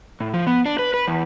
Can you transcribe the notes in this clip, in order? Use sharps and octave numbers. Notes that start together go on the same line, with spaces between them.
A2
F3
B3
D4
B4
B4
E2